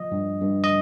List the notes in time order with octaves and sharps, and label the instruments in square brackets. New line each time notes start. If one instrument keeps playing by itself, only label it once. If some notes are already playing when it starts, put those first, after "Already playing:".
Already playing: [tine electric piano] F3 D#5
G2
G2
D#5